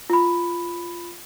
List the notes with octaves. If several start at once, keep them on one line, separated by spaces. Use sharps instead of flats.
F4 B5